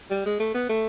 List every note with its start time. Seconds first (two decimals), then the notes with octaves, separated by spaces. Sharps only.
0.11 G3
0.26 G#3
0.40 A3
0.55 B3
0.69 A3